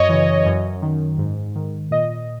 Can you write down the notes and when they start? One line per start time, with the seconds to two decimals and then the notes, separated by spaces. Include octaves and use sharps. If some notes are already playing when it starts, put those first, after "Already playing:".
Already playing: F#2 C#5 D#5
0.09 C#3 E3
0.46 F#2
0.82 D#3
1.18 G#2
1.56 D#3
1.91 A#2 D#5